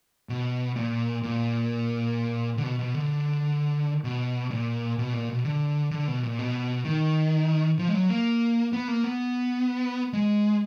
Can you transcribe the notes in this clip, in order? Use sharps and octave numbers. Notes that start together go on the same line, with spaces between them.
B2
A#2
A#2
D3
B2
B2
D3
B2
A#2
B2
A#2
B2
D3
D3
B2
A#2
B2
D#3
F3
G#3
F#3
A#3
B3
A#3
B3
G#3